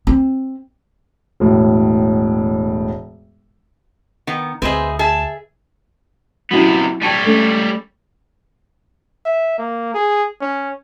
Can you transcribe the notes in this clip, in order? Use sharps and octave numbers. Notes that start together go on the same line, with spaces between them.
C4
E1 A2
D#3 B3
D2 C4 G#4 B4 C5 D#5 E5
G#4 E5 A5
C3 F#3 B3 C#4 E4
G3 C#5 G5 A5 D#7
A3 C#4
E5
A#3
G#4
C#4